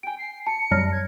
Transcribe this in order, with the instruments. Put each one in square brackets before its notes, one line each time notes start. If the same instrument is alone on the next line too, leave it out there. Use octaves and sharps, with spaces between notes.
[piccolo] G5 [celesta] G#5 D7
[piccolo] C7
[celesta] A5 [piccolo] C#7
[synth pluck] F#2 F#3 G3 [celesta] A5 F6 A#6
[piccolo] G#6